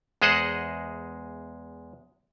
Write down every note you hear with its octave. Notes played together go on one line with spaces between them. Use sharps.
E2 G#3 G#4 C5 D#5 F#5